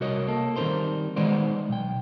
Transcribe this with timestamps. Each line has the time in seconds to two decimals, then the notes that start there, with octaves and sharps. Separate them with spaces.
0.01 C2 F#4 A#4 C#5 D#5
0.28 A#3 A4
0.56 D#3 G3 C4 E4 A#4 C5
1.16 D#3 G#3 B3 D#4 C5 D5
1.69 B1 G5